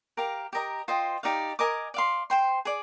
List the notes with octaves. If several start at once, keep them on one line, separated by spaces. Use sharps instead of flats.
G4 A#4 F5 A#5
G4 A#4 D#5 A#5
F4 C5 D#5 G5
D#4 G4 D5 F5
A#4 D#5 G#5 D6
D5 F5 C6
C5 G5 C6
G#4 D5